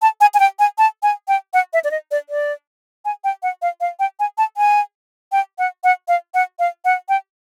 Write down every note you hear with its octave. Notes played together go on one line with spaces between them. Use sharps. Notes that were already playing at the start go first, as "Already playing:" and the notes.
A5
G#5
G#5
G5
G#5
A5
G#5
G5
F#5
E5
D5
D#5
D5
D5
G#5
G5
F#5
F5
F5
G5
G#5
A5
G#5
G5
F#5
F#5
F5
F#5
F5
F#5
G5